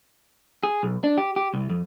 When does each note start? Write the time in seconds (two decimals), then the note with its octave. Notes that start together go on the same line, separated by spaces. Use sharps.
0.63 G#4
0.83 B1
1.04 D4
1.18 G4
1.36 G4
1.54 C2
1.70 F2